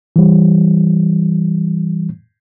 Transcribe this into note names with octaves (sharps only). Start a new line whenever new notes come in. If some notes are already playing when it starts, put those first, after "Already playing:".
E3 G3